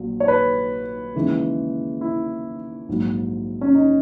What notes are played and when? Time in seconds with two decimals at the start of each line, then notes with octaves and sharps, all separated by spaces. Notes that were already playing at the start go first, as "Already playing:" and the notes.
Already playing: A#1 A#2 F#3
0.20 C#5
0.28 B4
1.15 D#2 C#3 E3 G#3
2.01 E4
2.89 A#1 G#2 F#3
3.61 C#4
3.75 D#4